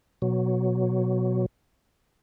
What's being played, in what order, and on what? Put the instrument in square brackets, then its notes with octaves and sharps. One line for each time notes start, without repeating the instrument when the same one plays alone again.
[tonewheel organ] B2 F#3